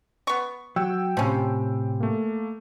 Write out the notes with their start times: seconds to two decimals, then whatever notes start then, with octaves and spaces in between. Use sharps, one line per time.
0.27 B3 C#6
0.76 F#3 G5 E6
1.17 A2 C3 F3 C#4
2.00 A3 A#3